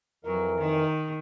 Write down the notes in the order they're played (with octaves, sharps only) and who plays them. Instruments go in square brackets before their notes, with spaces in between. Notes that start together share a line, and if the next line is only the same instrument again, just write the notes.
[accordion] F2 E3 A#4 [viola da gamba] F#3
[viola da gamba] D#3